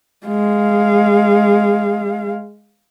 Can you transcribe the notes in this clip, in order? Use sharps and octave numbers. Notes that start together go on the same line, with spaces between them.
G#3 F5